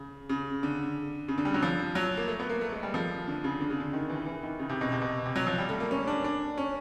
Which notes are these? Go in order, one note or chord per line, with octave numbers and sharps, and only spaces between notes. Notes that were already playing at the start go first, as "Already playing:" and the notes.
Already playing: C#3
C#3
D3
C#3
D3
G3
F#3
F3
F#3
A#3
A3
B3
A#3
A3
G#3
G3
F3
D3
C#3
D3
C#3
D3
D#3
E3
E3
D#3
C#3
C3
B2
C3
B2
C3
F#3
F3
G3
A3
A#3
C#4
D4
D4
C#4